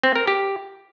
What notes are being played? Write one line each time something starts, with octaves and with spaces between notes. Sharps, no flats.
C4
A#4
G4